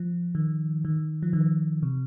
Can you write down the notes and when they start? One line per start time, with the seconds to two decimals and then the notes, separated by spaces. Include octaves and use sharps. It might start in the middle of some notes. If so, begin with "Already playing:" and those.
Already playing: F3
0.35 D#3
0.85 D#3
1.23 F3
1.33 D#3
1.83 C3